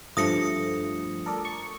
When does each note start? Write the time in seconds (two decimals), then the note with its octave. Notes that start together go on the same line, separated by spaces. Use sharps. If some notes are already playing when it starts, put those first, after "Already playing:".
0.17 G2 F3 A3 D#6 A#6 C#7
1.26 A4 A#4 D5
1.45 C#6